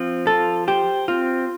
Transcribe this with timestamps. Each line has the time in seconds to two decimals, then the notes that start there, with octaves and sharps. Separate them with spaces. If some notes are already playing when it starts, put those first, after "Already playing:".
Already playing: F3 C4
0.27 F4 A4
0.68 G4 C5
1.08 C4 F4